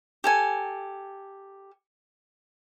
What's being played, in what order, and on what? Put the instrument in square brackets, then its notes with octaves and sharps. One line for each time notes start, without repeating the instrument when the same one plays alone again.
[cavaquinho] G4 A4 G#5